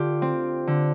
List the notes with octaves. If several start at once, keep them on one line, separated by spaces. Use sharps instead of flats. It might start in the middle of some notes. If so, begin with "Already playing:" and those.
Already playing: D3 F4 G4 A4
C4
D3